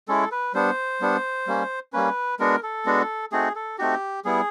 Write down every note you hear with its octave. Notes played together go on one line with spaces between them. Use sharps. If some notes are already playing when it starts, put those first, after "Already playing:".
G#3 C#4 E4 A4
B4
G3 B3 D4 C5
G3 B3 D4
G3 A#3 C#4
G3 A#3 C#4 B4
G#3 B3 D4 F#4 A#4
A4
G#3 B3 D4 F#4
A3 C4 D#4 F#4 G#4
A4
A3 C4 D#4 F#4 G4
G3 B3 E4 G#4